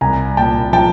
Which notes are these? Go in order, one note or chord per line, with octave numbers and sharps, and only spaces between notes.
C2 G#5 A#5
A#2 G5 A5
F3 G5 A5